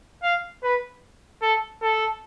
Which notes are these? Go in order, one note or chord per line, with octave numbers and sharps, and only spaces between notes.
F5
B4
A4
A4